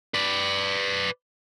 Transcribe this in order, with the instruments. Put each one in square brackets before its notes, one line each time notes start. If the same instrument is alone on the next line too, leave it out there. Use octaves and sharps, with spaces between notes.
[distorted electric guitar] B4 D5